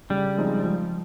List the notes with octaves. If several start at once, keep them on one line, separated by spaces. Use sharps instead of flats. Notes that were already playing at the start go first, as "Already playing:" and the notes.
C#3 G3
F3 G#3 C4 D#4
F3